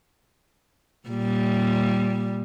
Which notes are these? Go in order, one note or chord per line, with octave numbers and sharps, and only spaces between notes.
A#2 G3